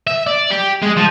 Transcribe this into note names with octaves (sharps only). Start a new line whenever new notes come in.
E5
D5
G4
G#3
F3